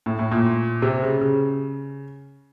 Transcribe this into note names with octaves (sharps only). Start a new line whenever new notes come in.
A2
A2
A#2
C3
C#3
C#3